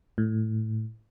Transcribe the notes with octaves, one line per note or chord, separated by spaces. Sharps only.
A2